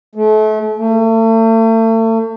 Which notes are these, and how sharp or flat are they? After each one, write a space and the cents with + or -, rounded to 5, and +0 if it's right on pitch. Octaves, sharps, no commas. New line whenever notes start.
A3 -35
A3 +35